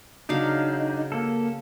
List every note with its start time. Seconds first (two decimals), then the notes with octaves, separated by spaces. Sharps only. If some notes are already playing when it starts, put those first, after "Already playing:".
0.29 C#3 F#3 D4 D#4 F5
1.12 A#3 A4